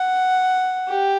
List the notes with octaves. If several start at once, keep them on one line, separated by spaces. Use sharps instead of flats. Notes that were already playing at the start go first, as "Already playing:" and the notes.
Already playing: F#5
G4